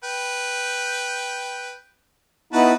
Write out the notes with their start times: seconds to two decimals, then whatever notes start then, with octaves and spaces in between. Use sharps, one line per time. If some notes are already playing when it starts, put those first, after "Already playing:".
0.04 B4 G5
2.53 B3 D#4 E4 F#4 B4 A5